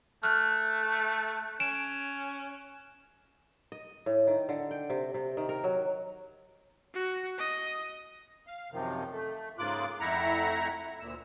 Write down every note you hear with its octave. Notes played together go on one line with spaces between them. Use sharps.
A3 F6 F#6
C#4 D7 E7
D#5
A2
D#3
D3
G5
C3
C3
D#3
A#4
F#3
F#4
D#5
F5
F#2 C3 D#3 F3
A3
G#2 C#3 A#3 F4 D6 F#6
F2 A3 E4 E5 F#5 A#5
D2 A#2 E6